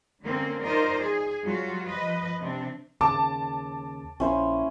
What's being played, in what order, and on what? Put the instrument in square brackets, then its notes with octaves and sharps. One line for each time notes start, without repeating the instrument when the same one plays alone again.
[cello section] D3 A#3 C4 C#4
D#4 F4 A#4 C5 D5 D#5
G#4
F#3 G3 F4 F#4
F3 B4 D#5
C3 C4 D4
[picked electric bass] D#2 C#3 [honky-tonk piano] A5 [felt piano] D6
[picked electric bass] A#1 [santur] C#4 E4 C5